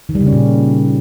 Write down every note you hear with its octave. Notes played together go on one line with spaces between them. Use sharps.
D#3
G3
C#3
C#4
A#2